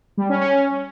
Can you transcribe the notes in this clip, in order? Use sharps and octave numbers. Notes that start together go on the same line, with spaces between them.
G3
C#4
C#4